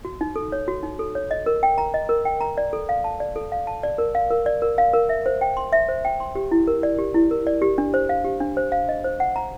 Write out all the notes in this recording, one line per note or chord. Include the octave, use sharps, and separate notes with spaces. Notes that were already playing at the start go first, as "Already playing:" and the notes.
F#4
D#4
A4
C#5
F#4
D#4
A4
C#5
D#5
A#4
G5
A#5
D#5
A#4
G5
A#5
D5
A4
F5
A5
D5
A4
F5
A5
D5
A#4
F5
A#4
D5
A#4
F5
A#4
E5
C5
G5
C6
E5
C5
G5
C6
G4
E4
A#4
D5
G4
E4
A#4
D5
G4
D4
C5
F5
G4
D4
C5
F5
D#5
C5
F#5
A#5